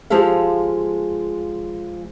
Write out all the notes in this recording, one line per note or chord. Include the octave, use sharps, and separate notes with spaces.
F3 G#3 G4 A4 F5